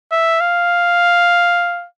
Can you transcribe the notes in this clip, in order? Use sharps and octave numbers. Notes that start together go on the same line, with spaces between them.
E5
F5